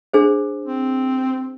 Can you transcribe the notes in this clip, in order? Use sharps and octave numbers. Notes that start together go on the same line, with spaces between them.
D4 G#4 C5
C4